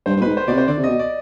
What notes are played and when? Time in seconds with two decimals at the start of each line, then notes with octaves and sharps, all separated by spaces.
0.06 G2 C5
0.16 G2
0.22 G#2 B2 B4
0.37 C5
0.48 B2 D5
0.52 C3
0.58 C5
0.68 D3 D5
0.78 C3
0.84 B2 D#5
0.99 D5